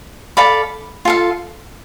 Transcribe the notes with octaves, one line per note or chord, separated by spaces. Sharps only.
A4 D5 F5 B5
F4 A4 F5